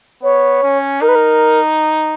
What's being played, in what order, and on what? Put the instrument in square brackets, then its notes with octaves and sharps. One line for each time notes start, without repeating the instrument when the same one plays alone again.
[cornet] B3 [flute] C#5
[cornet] C#4
[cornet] D#4 [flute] A#4
[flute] B4
A#4